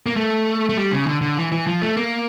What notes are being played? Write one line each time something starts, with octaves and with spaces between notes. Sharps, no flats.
A#3
A3
A3
G3
C#3
D3
D3
E3
E3
F3
A3
A#3